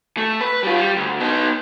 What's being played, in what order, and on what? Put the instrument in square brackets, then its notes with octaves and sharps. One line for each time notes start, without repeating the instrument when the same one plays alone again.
[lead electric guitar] A3
B4
G3 F4
G3
D2
B3 D#4